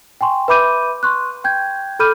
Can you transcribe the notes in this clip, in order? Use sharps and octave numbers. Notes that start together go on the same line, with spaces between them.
G5 G#5 C6 C#6
B4 E5 B5 D6 G6 D#7
C6 C#6 F#6
G5 G6 G#6
A4 B5 D6 F6 G6 D#7